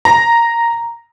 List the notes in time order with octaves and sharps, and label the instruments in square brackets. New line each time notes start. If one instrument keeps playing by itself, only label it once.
[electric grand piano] A#5